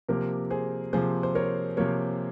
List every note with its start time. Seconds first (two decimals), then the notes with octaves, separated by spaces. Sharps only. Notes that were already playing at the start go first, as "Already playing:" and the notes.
0.09 C3 F3 A#3 G4 A#4
0.50 G#4 C5
0.93 C3 F3 A#3 G#4 C5
1.23 C5
1.35 A#4 C#5
1.77 C3 F3 A#3 A#4 C#5